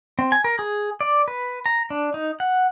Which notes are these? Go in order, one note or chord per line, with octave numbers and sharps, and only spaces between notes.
C4
G#5
A#4
G#4
D5
B4
A#5
D4
D#4
F#5